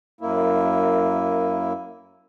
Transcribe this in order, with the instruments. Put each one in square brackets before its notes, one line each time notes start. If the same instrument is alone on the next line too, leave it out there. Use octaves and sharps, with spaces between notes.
[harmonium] F#2 A#3 E4